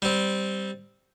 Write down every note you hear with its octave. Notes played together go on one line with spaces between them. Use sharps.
G3 C4